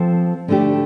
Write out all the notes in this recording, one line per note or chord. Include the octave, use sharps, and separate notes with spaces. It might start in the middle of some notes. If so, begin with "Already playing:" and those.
Already playing: F3 C4 A4 C5
D3 A3 D4 G4